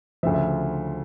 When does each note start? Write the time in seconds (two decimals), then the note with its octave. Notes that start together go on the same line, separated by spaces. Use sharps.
0.23 D2 C#3 F3 E5
0.34 E5